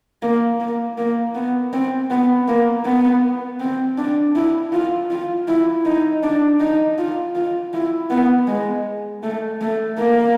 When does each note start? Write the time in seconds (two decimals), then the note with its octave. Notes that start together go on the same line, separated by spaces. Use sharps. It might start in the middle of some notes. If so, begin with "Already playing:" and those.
0.22 A#3
0.60 A#3
0.98 A#3
1.35 B3
1.73 C4
2.11 B3
2.48 A#3
2.85 B3
3.60 C4
3.98 D4
4.36 E4
4.73 F4
5.11 F4
5.48 E4
5.85 D#4
6.23 D4
6.60 D#4
6.98 F4
7.35 F4
7.73 E4
8.10 B3
8.48 G#3
9.23 A3
9.61 A3
9.98 A#3